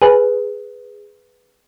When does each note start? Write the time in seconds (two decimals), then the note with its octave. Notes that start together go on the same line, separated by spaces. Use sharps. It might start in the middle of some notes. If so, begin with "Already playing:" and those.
0.02 G#4 B4